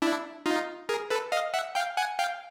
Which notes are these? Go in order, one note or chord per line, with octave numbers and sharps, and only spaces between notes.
D4 E4
D#4 F4
G#4 A#4
A4 B4
D#5 F5
E5 F#5
F5 G5
F#5 G#5
F5 G5